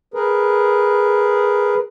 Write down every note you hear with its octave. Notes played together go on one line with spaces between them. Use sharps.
G#4 A#4 B4